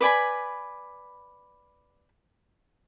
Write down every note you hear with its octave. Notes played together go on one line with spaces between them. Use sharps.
B4 D5 G#5 B5